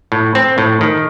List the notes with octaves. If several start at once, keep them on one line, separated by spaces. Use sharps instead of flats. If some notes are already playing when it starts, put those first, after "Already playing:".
A2
C4
A2
D#3